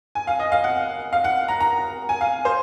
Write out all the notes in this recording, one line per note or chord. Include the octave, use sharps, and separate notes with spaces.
G#5
F5
D#5
F5
F#5
F5
F#5
A#5
A#5
G#5
F5
C5